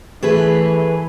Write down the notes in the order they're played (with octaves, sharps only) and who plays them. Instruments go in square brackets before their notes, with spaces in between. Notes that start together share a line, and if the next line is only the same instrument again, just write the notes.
[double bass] E3 [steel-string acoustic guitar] A3 G#4 B4